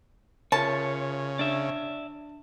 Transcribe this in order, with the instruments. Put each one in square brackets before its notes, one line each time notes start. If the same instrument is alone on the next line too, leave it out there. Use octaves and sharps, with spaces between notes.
[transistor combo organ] C#3 [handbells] F4 A#4 E5 [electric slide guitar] C#5 [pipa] A5
[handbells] D4 [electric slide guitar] D5 E5